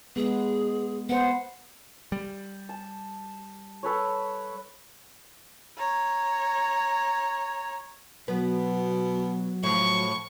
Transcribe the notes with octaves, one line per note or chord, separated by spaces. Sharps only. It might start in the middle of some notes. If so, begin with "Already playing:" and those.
G#3 B3 G#4
B3 C5 F#5
G3
A5
A4 B4 C#5
C#5 A#5
B2 F#3 B3
A2 F3 C#6